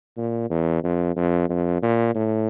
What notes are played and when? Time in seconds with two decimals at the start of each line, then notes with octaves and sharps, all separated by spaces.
0.17 A#2
0.50 E2
0.84 F2
1.16 F2
1.49 F2
1.82 A#2
2.15 A2